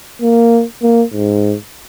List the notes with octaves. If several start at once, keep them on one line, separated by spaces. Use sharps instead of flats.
A#3
A#3
G#2